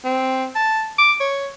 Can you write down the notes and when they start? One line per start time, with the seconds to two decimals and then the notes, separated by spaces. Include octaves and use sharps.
0.04 C4
0.55 A5
0.98 D6
1.20 C#5